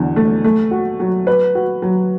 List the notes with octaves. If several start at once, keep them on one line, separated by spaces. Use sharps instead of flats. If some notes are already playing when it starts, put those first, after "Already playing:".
Already playing: E2 B2 D3
A3
A3
F#4
F#3
B4
F#4
F#3